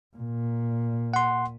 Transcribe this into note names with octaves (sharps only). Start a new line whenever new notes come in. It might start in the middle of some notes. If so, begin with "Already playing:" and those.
A#2
F#5 C6